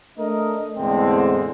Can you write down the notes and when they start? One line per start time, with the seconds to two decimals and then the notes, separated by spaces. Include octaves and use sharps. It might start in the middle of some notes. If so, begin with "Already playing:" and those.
0.18 A3 D4 A#4 D#5
0.77 E2 A2 D3 G#3 C4